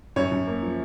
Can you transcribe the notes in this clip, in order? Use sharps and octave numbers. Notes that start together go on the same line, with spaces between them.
F#2 C#5
F#2
A#3
F3